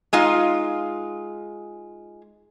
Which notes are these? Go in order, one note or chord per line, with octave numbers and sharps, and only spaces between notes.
G#3 D#4 F4